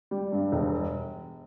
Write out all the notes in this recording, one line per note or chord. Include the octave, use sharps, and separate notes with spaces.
G3
G2
E1